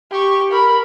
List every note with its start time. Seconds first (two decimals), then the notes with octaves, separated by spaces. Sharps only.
0.11 G4 C#6
0.51 A#4 B5